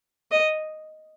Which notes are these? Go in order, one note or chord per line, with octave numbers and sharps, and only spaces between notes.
D#5